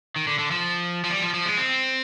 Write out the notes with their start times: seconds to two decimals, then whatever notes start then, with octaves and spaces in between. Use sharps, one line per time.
0.16 D#3
0.27 D3
0.39 D3
0.51 F3
1.04 F3
1.10 G3
1.22 F3
1.34 F3
1.46 G#3
1.57 C4